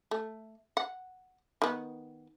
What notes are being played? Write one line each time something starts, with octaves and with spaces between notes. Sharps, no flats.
A3
F#5
D#3 B3